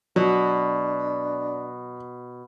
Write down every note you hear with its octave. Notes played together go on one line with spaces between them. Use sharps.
B2 F#3 D4